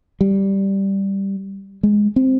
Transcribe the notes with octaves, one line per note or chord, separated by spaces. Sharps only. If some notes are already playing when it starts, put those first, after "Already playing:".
G3
G#3
C4